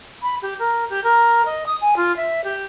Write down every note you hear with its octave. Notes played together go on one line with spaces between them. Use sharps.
B5
G4
A#4
G4
A#4
D#5
D#6
G#5
F4
E5
G4